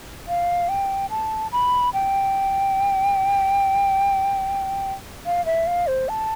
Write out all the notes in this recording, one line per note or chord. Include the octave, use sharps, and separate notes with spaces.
F5
G5
A5
B5
G5
F5
E5
F5
C5
A5